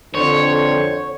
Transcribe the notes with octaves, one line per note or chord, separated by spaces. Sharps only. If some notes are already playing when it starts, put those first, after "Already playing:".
F2 D3 C5 C#5